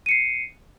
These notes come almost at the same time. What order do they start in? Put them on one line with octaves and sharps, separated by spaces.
D#7 C#7 C7